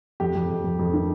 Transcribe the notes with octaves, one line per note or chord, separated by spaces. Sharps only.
F2 G4
F2
F2
F2
F2
D#3